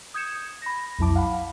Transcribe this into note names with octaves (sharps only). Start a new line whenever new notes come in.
D#6 G6 G#6 C#7 E7
B5 A#6
B1 F2 F#3 E4 A5 D6
F5 F#5 B5